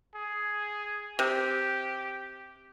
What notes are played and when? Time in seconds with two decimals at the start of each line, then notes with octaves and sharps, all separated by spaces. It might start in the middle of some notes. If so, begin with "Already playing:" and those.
0.15 G#4
1.19 C3 G4